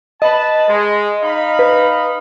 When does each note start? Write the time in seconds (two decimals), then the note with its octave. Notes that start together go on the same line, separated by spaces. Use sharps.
0.22 B4 D#5 A5
0.68 G#3
1.22 D#4 F5 B5
1.59 B4